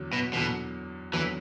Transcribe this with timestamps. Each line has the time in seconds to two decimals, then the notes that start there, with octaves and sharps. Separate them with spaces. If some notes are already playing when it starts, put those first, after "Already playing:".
Already playing: E2 D3 F#3
0.13 B2
0.33 E2 B2 D3 F#3
1.13 E2 D3 E3 F#3